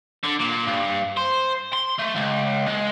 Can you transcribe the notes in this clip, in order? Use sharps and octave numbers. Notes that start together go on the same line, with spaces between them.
D3
A#2
G2
C5
C6
A3
C#2
G#3